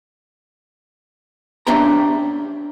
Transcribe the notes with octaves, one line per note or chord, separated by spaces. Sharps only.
C#4 D4 G4 E5 G5 A#5